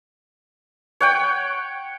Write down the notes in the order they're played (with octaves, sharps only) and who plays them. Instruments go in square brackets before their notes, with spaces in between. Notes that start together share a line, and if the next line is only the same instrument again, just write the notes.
[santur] C#5 F#5 G5